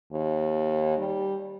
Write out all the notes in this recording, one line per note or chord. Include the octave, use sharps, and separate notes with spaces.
D#2
G3